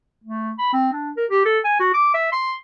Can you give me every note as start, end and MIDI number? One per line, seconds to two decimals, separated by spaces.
0.24 0.53 57
0.58 0.73 83
0.73 0.91 60
0.93 1.11 62
1.17 1.26 70
1.31 1.41 67
1.46 1.59 69
1.64 1.79 80
1.80 1.91 66
1.94 2.12 86
2.14 2.32 76
2.32 2.54 84